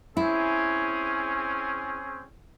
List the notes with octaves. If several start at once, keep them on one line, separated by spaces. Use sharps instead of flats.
C4 C#4 E4 G#4